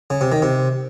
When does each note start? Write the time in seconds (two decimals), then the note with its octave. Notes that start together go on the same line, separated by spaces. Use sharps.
0.10 C#3
0.21 C3
0.32 D#3
0.42 C3